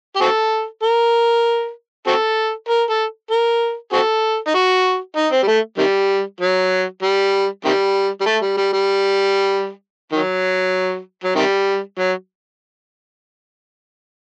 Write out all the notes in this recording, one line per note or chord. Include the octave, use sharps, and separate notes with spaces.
G4
C4 F#4 A4
A#4
C4 F#4 A4
A#4
A4
A#4
C4 F#4 A4
D#4
F#4
D#4
C4
G3
A3
C3 D#3 G3
F#3
G3
C3 D#3 G3
G3
A3
G3
G3
G3
D#3 F#3
F#3
C3 D#3 G3
F#3